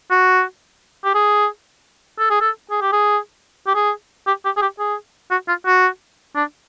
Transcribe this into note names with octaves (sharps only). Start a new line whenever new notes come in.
F#4
G4
G#4
A4
G#4
A4
G#4
G4
G#4
G4
G#4
G4
G4
G#4
G4
G#4
F#4
F4
F#4
D4